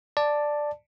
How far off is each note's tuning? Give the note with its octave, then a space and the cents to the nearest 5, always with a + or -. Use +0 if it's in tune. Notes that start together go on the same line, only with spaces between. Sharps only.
D5 +5 A5 +0